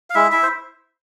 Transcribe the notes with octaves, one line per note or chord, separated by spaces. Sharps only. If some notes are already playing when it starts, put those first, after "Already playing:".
F5
G#3 E4 E5
E4 E5
C5